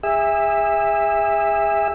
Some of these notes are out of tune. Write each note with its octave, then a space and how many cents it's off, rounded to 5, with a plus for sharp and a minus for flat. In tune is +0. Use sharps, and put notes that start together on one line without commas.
G#4 -35 E5 +0